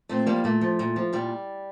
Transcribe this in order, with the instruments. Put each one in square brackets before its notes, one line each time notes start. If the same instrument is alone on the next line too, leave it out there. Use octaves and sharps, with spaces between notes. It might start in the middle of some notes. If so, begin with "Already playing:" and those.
[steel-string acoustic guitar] A#2 A3 C4
F3 G3 A#3
A#2 A3
F3
A#2
F3
A#2 G3